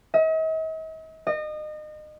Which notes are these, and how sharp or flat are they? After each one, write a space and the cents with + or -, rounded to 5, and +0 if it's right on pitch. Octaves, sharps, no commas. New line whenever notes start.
D#5 +45
D#5 -30